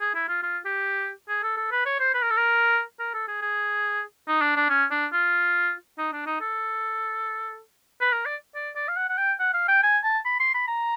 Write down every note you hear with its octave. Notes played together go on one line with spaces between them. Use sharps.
G#4
E4
F4
F4
G4
G#4
A4
A4
B4
C#5
C5
B4
A#4
A4
A#4
A#4
A4
G#4
G#4
D#4
D4
D4
C#4
D4
F4
D#4
D4
D#4
A4
B4
A#4
D5
D5
D5
F5
F#5
F#5
G5
F#5
F5
G5
G#5
A5
B5
C6
B5
A#5